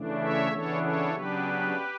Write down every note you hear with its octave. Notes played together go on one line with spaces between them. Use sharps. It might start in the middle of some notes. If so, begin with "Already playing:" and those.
Already playing: C#3 E3 A3 D4
C#5 E5
C#3 E3 B3 D4 A4 C#5
A4 C#5
C#3 F#3 B3 D4 G4 B4